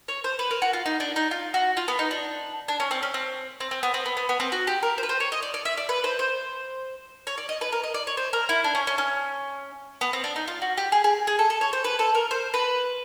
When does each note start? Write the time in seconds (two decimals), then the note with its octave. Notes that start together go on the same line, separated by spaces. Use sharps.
0.08 C#5
0.24 C5
0.39 B4
0.51 A#4
0.62 F#4
0.73 F4
0.86 D#4
1.00 D4
1.16 D#4
1.31 F4
1.54 F#4
1.77 F4
1.88 B3
1.99 D#4
2.11 D4
2.68 D4
2.80 C#4
2.91 C4
3.03 C#4
3.14 C4
3.60 C4
3.71 C4
3.83 B3
3.94 C4
4.06 B3
4.17 B3
4.29 B3
4.40 C4
4.52 F#4
4.67 G4
4.83 A#4
4.98 C5
5.03 B4
5.09 C5
5.20 C#5
5.32 D#5
5.42 D5
5.54 D5
5.65 E5
5.77 D5
5.89 B4
6.04 C5
6.19 C5
7.27 C#5
7.38 D5
7.49 D#5
7.61 B4
7.72 A#4
7.83 D#5
7.94 D5
8.07 C#5
8.17 C5
8.33 A#4
8.49 E4
8.64 D4
8.75 C#4
8.87 C#4
8.98 C#4
10.01 B3
10.13 C4
10.24 D4
10.36 D#4
10.48 F4
10.62 F#4
10.77 G4
10.92 G#4
11.04 G#4
11.27 G#4
11.39 A4
11.50 A4
11.61 C#5
11.73 C5
11.84 B4
11.99 A4
12.15 A#4
12.31 C5
12.54 B4